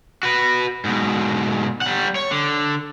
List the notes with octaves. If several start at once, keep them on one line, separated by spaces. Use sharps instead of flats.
F#4 B4
G#2 B2
G3 F#5
C#5
D3